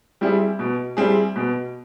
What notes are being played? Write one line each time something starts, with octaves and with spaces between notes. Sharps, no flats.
G3 C4 E4 G#4
B2
G3 C4 E4 G#4
B2